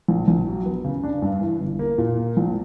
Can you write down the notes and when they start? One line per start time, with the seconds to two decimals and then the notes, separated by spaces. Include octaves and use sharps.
0.08 A#1
0.28 A#1
0.47 F#3
0.66 B3
0.85 C#3
1.03 D4
1.22 G2
1.41 E3
1.60 G1
1.79 A#3
1.98 A#2
2.17 A#3
2.37 A#1